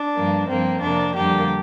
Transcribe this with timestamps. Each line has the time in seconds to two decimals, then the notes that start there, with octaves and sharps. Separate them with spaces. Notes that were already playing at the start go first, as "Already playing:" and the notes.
Already playing: D4
0.15 G2 F3 A#3
0.49 G2 F3 A#3 C4
0.82 F2 C3 A#3 D4
1.15 F2 D3 G3 A#3 G4